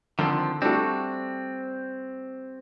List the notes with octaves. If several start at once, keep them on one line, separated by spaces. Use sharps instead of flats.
D3 D#3 F3 C4
G3 A3 C4 D4 F#4